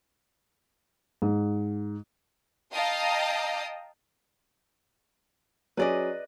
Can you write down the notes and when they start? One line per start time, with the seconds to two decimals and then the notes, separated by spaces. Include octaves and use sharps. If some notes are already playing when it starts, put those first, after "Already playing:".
1.22 G#2
2.73 D#5 F5 G5 A5 A#5 D#6
5.77 F#3 C#4 G#4 B4 D5 D#5